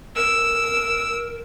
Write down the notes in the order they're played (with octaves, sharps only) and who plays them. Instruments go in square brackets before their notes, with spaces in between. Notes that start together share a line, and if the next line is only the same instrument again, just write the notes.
[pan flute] A#4 [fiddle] E6